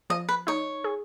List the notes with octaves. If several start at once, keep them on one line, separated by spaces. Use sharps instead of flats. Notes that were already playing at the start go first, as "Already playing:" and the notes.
F3 D#5
B4
D#4 C#5
G#4